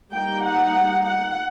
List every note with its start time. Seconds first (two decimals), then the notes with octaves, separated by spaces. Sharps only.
0.12 G3 A#3 D#4 G5
0.42 F#5
1.03 F#5